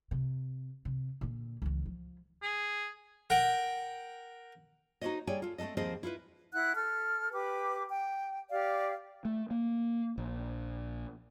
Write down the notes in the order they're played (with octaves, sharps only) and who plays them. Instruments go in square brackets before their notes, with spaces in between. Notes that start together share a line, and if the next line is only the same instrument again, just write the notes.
[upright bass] C3
C3
A#2 D3
C#2 E3
F3
[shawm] G#4
[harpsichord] A#4 F#5 G5
[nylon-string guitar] D#4 F#4 G#4 C5 C#5 D#5
G3 G#4 C#5 D5 G5 G#5
F4 A4
A3 C4 D#4 A4 D#5
D#2 F3 C4 G#4 C5 D#5
E4 F4 A4 B4
[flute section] E4 F#5 F#6
A4 F6
G4 B4 D6
G5
G4 D5 F5
[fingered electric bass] A3
A#3
A#1